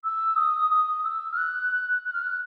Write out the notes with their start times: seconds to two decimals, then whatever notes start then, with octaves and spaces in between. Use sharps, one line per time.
0.04 E6
0.36 D#6
0.70 D#6
1.04 E6
1.32 F6
1.37 F#6
2.04 F#6
2.13 F6
2.22 F#6